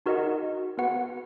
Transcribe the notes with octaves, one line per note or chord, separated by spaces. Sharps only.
D#4 F#4 A#4 D#5 F#5
B3 F#4 B4 F#5